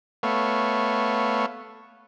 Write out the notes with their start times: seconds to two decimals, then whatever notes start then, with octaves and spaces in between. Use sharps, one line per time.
0.23 A3 B3 C#5 F5